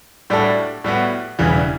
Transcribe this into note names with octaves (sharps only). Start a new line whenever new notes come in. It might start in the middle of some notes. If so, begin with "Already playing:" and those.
A2 G3 D4 F#4 A4
A2 G3 B3 F#4
E1 E2 C#3 E3 G3